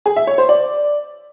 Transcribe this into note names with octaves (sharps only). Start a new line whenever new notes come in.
G#4
E5
C#5
C5
D5